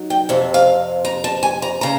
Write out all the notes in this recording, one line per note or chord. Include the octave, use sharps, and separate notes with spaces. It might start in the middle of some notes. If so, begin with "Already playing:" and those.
Already playing: F#3 D#4
G5
F2 C3
F5
A#5
A5
G#5
A#5
C#3 A#5